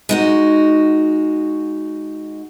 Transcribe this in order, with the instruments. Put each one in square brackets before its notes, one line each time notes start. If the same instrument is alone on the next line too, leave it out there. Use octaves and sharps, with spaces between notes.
[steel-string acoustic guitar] G#3 D#4 F#4